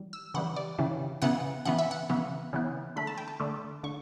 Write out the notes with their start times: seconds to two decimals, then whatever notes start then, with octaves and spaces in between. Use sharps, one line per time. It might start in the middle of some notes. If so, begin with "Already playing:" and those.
Already playing: E3 G3
0.13 E6
0.34 C#3 E3 G3 F#5
0.56 D5
0.78 C#3 E3 G3
1.22 C#3 E3 B3 F#5
1.65 C#3 E3 B3 F#5
1.79 E5
1.91 F#5
2.10 C#3 E3 B3
2.53 C#3 E3 B3
2.96 D3 A3 B5
3.07 A5
3.18 G5
3.28 A5
3.40 D3 A3
3.84 D3 C#6